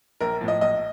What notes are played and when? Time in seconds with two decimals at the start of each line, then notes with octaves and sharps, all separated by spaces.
0.20 A#1 A#4
0.41 A2 F3
0.48 D#5
0.61 A#1 D#5